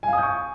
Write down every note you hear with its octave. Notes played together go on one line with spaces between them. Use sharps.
F5 G#5 C#6 D#6 G6